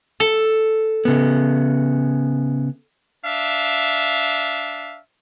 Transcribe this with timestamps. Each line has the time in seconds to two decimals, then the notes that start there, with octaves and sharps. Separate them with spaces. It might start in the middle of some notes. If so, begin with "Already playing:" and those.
0.20 A4
1.05 C#3 B3
3.24 D4 E5 F5